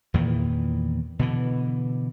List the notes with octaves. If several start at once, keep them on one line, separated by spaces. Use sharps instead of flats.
E2 A#2 D#3 E3
B2 D3 E3